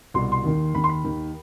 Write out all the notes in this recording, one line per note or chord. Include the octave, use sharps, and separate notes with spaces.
C2 B2 C6
C6
D#2 D#3
D#2 D#3 B5
C6
B5
D#2 D#3